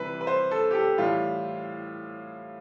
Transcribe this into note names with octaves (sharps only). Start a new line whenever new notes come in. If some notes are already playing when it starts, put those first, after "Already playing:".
Already playing: C3 E3 G3 B4
B4
C5
A4
G4
A4
A2 E3 G3 F4